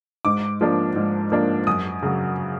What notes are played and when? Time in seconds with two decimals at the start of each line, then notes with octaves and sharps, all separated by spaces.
0.25 G#2 D6
0.61 F3 A#3 D4
0.96 G#2
1.32 F3 A#3 D4
1.67 F#2 D#6
2.02 C#3 F#3